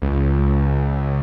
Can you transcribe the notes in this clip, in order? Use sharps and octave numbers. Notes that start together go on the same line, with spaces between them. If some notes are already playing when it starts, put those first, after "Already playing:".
C#2